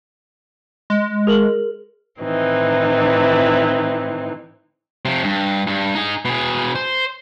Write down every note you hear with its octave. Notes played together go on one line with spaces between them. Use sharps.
G#3
G#4 A#4 F#7
A2 D#3 E3 C4 D#4
C3 F3
G2
G2
D#4 G#4
B2 G#4
C5